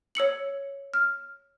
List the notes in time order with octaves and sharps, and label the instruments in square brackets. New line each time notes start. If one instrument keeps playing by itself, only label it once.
[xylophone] C#5 E6 C#7 F#7
F6